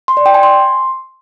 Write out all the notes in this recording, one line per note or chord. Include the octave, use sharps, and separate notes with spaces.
C6
D5
G5
G#5
C6